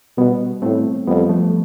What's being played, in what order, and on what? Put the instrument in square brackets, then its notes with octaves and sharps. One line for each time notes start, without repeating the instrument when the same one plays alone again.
[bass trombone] B2 [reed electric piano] G3 B3
[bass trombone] A2 [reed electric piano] A3 C4
[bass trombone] F2 [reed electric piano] G3 B3
[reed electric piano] F3 A3